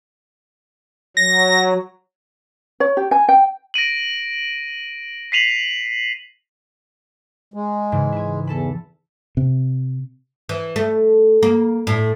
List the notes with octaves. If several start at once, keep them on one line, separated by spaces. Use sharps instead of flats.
F#3 A#6
C#5
G4
G#5
G5
A#6 D7 D#7 F#7
B6 C7 D#7 F7 F#7
G#3
G#2 C#3 E3
E4 G#5
E2 A4 A5 B5
C3
E3
A3
A#3
A2